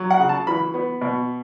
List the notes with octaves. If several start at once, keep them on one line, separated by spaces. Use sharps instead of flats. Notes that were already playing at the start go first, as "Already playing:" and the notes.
Already playing: F#3
F#5
C#3
A5
E3 B5
B3
B2